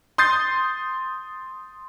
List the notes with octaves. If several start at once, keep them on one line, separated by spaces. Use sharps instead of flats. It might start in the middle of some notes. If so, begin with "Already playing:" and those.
C6 D#6 G6 A6 C7